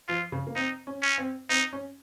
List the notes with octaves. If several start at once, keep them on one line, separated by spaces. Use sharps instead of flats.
F3 F4
C#3
A#3
C4 D#4
C#4
C#4
C4
C4 D#4
C#4